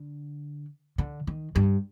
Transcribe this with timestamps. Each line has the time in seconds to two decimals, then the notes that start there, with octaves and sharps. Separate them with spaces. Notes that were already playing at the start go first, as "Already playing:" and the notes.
Already playing: D3
0.98 D3
1.27 D#3
1.56 G2